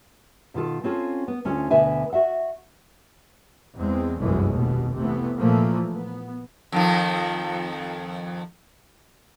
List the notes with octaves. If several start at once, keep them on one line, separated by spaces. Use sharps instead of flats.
B2 D#3 F4 A4
C4 C#4 F4 A4
B3
D2 C#4 F4 A4
D2 B2 D3 B4 E5 G#5
F#4 E5 F#5
E2 G#3 C4
G1 C2 F#2 E3 G#3 A3
F1 D#2 B2
C3 E3 A3 B3
A#2 E3 F3 A3 A#3
B3
F2 D#3 F3